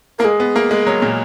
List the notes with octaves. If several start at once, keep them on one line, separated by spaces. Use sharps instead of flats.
A#3 A#4
G#3 G#4
B3
A#3
G#3
F#3
A#2